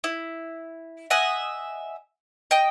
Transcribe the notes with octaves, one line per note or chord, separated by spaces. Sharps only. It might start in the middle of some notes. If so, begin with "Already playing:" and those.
E4
D#5 E5 F#5 G#5
D#5 G5